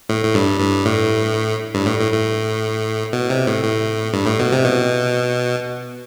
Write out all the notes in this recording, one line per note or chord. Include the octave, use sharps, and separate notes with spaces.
A2
A2
G2
G2
A2
G2
A2
A2
A2
B2
C3
A2
A2
G2
A2
B2
C3
B2